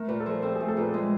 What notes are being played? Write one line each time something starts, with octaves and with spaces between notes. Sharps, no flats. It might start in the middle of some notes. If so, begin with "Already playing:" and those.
Already playing: A3 A#4
A#2 B4
A4
F3 A#4
C4 A4
A3 G#4
A4
A#2 B4
G#3